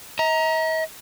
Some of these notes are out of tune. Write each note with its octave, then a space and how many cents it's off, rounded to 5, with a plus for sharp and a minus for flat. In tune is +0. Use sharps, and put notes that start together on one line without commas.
D#5 +45 A#5 +0